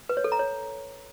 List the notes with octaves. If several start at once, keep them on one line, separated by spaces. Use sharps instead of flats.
B4
C#5
A4
A#5
C#5